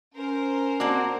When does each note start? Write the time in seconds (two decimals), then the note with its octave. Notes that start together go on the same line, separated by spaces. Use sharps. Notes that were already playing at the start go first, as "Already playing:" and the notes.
0.14 C#4 A#4 C5
0.80 A#3 C4 D4 F#4